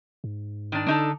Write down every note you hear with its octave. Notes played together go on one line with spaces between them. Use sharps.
G#2
D#3 D4
D3 D4 D#4 A4